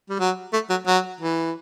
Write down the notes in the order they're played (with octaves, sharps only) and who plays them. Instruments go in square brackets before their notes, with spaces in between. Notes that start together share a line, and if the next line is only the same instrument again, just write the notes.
[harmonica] G3
F#3
A3
F#3
F#3
E3